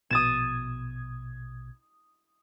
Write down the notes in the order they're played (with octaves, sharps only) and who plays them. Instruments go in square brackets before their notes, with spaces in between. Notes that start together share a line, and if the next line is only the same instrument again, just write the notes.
[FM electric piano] A#1 B2 G#6 [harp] D#6 A6 E7